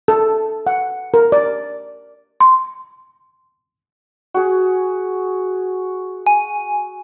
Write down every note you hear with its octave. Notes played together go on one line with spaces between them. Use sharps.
A4
F#5
A#4
D5
C6
F#4 G#4
G#5